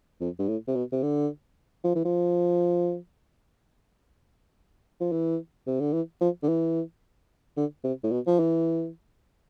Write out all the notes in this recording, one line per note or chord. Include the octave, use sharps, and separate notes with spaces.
F2
G2
A2
C3
B2
C3
D3
F3
E3
F3
F3
E3
C3
D3
E3
F3
D3
E3
D3
C3
A2
B2
F3
E3